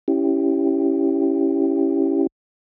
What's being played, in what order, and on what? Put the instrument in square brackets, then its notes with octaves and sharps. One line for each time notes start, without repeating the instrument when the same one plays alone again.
[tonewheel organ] C#4 E4 G4